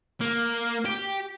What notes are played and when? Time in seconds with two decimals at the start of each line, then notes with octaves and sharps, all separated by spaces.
0.21 A#3
0.85 G4 G5